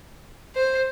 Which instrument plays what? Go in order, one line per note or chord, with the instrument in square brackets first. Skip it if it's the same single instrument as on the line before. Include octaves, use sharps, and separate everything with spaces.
[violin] C5